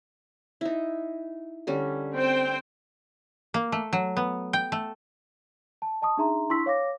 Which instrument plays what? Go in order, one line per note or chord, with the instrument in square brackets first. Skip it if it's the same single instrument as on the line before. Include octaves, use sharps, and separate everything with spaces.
[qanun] D#4 E4
D3 G3 C#4
[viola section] C4 C5 G5
[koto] A#3
A3
F#3
B3
G5
A3
[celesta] A5
D#5 A5 C#6 D#6
D4 D#4 G#4 E5 A#5 C6
D4 E4 C6 C#6 E6 B6
C#5 F5 D6 A#6